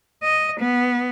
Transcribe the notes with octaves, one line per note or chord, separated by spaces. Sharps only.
D#5
B3